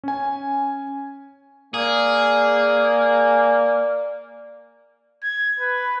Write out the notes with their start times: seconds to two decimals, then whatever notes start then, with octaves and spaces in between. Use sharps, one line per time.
0.04 C#4 G#5
1.74 A#3 G#4 D5
5.23 G#6
5.59 B4